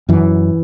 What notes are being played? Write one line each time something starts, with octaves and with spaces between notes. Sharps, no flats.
F#2 E3